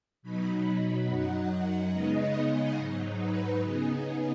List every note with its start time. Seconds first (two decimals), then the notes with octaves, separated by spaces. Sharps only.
0.23 B2 F#3 D#4 B5
1.08 F#2 F#3 D#4 F#5
1.92 C#3 G#3 B3 D#4 D#5
2.78 G#2 F#3 D#4
3.20 B4
3.62 C#3 B3 D#4 G#4